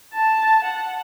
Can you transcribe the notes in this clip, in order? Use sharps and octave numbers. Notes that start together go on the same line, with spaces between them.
A5
F#5